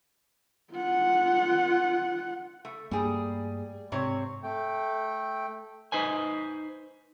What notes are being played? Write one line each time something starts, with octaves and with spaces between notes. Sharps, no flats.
F4 F#5
A3
G2 G3 A3 A#3 G#4
G#2 C3 C4 C#5
A3 G5
D#4 B4 C5 G#5